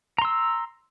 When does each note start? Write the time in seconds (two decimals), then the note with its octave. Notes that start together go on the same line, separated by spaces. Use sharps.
0.19 A#5
0.22 C6
0.25 E6